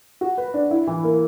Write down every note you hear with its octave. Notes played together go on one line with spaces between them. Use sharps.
F#4
B4
D4
E4
E3
A#3